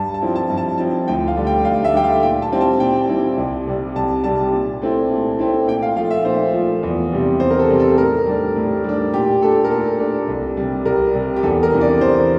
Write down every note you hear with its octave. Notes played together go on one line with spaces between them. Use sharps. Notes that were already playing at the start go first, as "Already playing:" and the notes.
Already playing: G2 A5
A5
F3 C4 E4
A5
G2
A5
F3 C4 E4 A5
D2 G5
F5
D3 G3 D4
G5
D2 F5
E5
D3 G3 D4 G5
F5
A#2 G5
A5
G3 C4 E4
A5
A#2 G5
G3 C4 E4
C2
C3 G3
C2 A5
C3 G3 A5
A#2
A3 C4 E4
A#2
A3 C4 E4
A#2 G5
F5
F3 A3 F5
E5
A#2 C5
F3 A3
E2
C3 G3
E2 C5
A#4
A4
C3 G3
A4
A2 A#4
G3 D4
A2
G3 D4
A#2 G4
A3 D4 A4
A#4
A#2 A4
A3 D4
C2
C3 G3
C2 A#4
C3 G3
G4
E2 A4
A#4
C3 E3 A#3 D4
D5
E2 C5